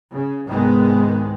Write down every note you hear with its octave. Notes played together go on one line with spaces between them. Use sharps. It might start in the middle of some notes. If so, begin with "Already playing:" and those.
C#3
C2 G#2 D#3 G#3 B3